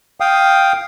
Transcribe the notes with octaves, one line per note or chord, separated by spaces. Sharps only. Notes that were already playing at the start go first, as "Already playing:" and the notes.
F5 G5 D#6